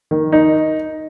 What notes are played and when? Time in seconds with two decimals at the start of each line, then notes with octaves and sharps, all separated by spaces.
0.11 D#3
0.32 D#4